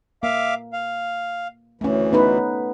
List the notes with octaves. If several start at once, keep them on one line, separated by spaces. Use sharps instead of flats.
A#3 E5 F5 D6
F5
D2 E3 A3 C#4
B3 D#4 B4